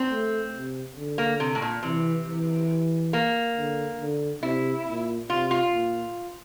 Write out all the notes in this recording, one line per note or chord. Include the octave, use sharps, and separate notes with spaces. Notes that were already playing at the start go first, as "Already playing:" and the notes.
Already playing: C4
A3
C3
D3
A#3
C3
A2
A#2
C3 E3
E3
A#3
D3
D3
C3 E4
A#2
C3 F4
F4
A#2